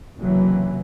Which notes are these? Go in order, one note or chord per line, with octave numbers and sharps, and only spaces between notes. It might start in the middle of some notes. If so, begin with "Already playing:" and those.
F#1 C3 E3 F#3